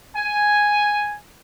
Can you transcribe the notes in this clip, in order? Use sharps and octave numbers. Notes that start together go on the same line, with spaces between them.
G#5